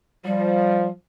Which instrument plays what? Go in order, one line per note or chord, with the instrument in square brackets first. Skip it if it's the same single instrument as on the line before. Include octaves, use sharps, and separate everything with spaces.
[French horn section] F3 [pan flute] G3